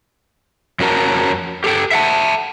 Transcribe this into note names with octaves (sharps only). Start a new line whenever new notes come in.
F2 C#4 F#4 A#4 A5
G4 A4 G5
E5 F#5 A5